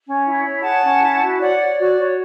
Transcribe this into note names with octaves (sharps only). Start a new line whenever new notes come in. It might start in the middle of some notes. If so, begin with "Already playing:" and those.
C#4
E4
C#5
G#4 F#5 A5
C#4
E4
F#4
C#5 D5 F#5
C#5 D5
F#4 D5
F#4 C#5